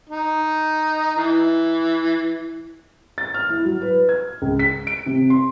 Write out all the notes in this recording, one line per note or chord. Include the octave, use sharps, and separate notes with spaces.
D#4
E3
A6
F6
E4
F#3
B4
G#6
C#2
B6
D7
C3
C6